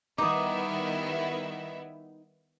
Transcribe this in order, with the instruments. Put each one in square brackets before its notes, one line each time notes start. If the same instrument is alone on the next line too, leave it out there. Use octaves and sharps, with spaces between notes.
[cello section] D#3 G3 [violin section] B3 E4 E5 [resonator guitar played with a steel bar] D#4 [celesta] D6 D#6